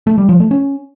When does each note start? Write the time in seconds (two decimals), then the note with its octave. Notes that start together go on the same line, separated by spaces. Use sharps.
0.07 A3
0.18 G3
0.29 F3
0.40 A3
0.51 C#4